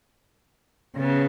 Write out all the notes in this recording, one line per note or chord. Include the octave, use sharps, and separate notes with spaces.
C#3 B3